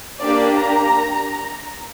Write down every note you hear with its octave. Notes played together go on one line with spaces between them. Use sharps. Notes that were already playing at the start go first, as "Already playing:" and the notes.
A#3 D4 G4 D5
A#5